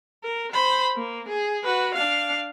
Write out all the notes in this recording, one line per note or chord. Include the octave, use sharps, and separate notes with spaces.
A#4
C5 B5
A#3
G#4
F#4 B4
D4 F5